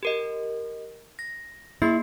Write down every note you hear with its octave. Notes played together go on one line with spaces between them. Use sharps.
G4 A#4 D#5
A#6
A#3 E4 G#4 C7